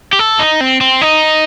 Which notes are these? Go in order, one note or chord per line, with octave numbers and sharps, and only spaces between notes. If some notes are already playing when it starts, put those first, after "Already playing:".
G4
A4
D#4
C4
C4
D#4